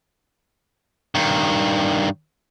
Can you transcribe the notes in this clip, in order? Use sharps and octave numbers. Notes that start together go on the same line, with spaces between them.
G2 D#3